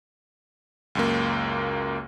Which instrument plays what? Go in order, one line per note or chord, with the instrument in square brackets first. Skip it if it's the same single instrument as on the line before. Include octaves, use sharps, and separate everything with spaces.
[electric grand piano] C#2 F#2 A#3